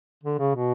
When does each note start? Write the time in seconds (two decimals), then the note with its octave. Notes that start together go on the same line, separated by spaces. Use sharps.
0.24 D3
0.39 C#3
0.54 B2